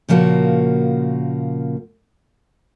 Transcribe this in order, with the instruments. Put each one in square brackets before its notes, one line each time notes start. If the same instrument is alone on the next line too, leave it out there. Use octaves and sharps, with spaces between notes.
[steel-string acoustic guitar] A#2 C#3 F3 A#3 F#4